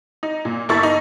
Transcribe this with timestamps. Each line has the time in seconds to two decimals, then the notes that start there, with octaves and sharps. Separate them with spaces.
0.23 D#4
0.45 A#2
0.69 G1 E4 A#4 C#6 A6
0.83 D#4